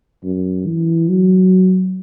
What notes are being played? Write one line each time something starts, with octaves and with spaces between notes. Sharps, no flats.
F#2
E3
F#3